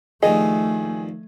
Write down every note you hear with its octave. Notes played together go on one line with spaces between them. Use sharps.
G2 D#3 F3 A3 G#4 D#5